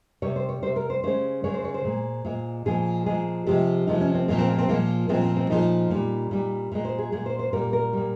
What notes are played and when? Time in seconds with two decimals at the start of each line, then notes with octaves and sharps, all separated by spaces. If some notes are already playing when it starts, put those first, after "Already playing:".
0.22 C3 G3 C#5
0.36 C5
0.49 C#5
0.62 C3 G3 C5
0.76 A#4
0.90 C5
1.03 C#3 G#3 C5
1.44 C#3 G#3 C#5
1.54 C5
1.64 C#5
1.74 C5
1.85 A#2 G#3
2.25 A#2 G#3
2.66 A#2 F3 G#3 G#4
3.06 A#2 F3 G#3 G#4
3.47 C3 F3 G#3 G4
3.87 C3 F3 G#3 D#4
4.01 C#4
4.15 C4
4.28 A#2 F3 G#3 A#3
4.38 C4
4.48 A#3
4.58 C4
4.68 A#2 F3 G#3 A#3
5.09 A#2 F3 G#3 C4
5.23 C4
5.36 C4
5.50 A#2 F3 G#3 D#4
5.91 A#2 G3
6.31 A#2 G3
6.72 A#2 G#3
6.85 C5
6.98 G#4
7.12 A#2 G#3 G#4
7.26 C5
7.39 C5
7.53 A#2 G3 A#4
7.73 A#4
7.93 A#2 G3